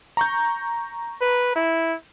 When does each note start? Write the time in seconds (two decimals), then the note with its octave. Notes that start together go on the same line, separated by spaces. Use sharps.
0.17 A#5 C#6 G6
1.21 B4
1.55 E4